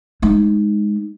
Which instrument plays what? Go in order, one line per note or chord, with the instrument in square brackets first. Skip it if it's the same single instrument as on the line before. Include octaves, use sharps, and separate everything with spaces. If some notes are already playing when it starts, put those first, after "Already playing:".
[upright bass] G#3 D#4